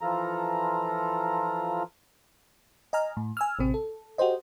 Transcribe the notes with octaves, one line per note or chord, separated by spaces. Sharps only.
E3 F3 F4 A4 A#5
D#5 G#5 A#5 F6
A2
G#5 E6 F6
A1 C3 C4
A4
F#4 G4 A4 C5 D#5